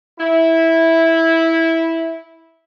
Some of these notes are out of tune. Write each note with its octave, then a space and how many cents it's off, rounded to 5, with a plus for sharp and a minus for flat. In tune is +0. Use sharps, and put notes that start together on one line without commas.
E4 -10